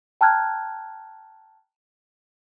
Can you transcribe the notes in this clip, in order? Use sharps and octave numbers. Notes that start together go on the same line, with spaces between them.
G5 A5 A#5 F6 F#6 G#6